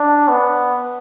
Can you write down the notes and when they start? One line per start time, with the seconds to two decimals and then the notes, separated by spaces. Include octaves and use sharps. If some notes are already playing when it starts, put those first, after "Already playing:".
Already playing: D4
0.28 B3